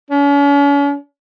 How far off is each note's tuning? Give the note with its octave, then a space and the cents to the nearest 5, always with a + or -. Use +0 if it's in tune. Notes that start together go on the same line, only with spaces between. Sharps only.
C#4 +40